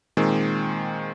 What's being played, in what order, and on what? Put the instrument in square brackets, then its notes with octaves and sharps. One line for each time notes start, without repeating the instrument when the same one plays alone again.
[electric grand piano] A#2 D#3 G#3 C4